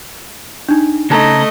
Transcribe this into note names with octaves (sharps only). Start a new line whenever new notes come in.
D4 D#4
C#3 A3 D#5 A5 A#5